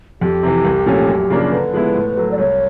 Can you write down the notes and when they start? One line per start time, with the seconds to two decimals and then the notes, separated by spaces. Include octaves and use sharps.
0.21 F2 G4
0.43 C3 E3
0.65 C2
0.86 A#2 F3 A3 C#4
1.08 F#2
1.30 C#3 F3 A#3 D4
1.51 D3 B4
1.73 F3 G#3 B3 E4
1.95 A2
2.17 F#3 A3
2.31 D5
2.38 C2 C#5